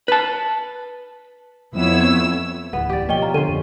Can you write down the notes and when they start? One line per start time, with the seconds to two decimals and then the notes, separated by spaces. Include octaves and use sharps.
0.08 B4 A5
1.74 F2 B3 E4 C#5 E6
2.73 D1 E2 B3
2.90 G4 D5
3.09 B2 F3 A#3 C#4 D#5 G5 G7
3.22 F4 A#5
3.34 D3 C#4 C5 D#7
3.49 F2